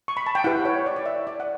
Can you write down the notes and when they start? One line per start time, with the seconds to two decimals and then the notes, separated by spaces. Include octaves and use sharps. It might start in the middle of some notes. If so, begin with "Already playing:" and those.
0.08 C#6
0.17 B5
0.26 A5
0.35 G5
0.44 E4 G4 B4 F#5
0.65 C#5
0.86 D5
0.96 D5
1.06 E5
1.27 D5
1.40 F#5